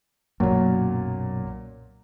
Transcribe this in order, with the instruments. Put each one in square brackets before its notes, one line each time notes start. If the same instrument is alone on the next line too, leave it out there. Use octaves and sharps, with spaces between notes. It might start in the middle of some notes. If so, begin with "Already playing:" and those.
[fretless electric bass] B1 F#2 [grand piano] A#2 F#3